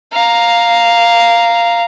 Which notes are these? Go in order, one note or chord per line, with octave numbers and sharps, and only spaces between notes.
F5 A#5